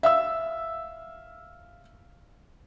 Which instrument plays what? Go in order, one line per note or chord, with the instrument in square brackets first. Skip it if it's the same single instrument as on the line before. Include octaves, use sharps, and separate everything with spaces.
[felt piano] E5 F5 E6